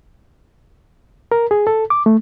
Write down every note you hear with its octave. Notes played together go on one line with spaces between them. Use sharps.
A#4
G#4
A4
D6
A3